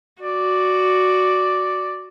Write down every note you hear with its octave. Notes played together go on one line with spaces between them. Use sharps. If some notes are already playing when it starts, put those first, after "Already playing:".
F#4 D5